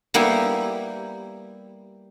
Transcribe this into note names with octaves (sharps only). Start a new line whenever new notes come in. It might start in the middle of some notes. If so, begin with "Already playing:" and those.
G3 A#3 B3 E4 G4